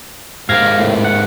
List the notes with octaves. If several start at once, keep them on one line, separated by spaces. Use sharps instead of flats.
G#2 G4 A#4 F5 G#6 A#6
A2
F#5